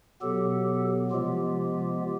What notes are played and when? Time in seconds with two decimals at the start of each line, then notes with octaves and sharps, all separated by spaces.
0.21 B2 F#3 B3 G4 A4
1.11 C3 F3 G#3 B3 F4 G4